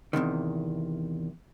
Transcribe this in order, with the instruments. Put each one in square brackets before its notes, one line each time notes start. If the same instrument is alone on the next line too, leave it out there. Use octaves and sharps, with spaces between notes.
[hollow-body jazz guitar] E2 A2 C3 D#3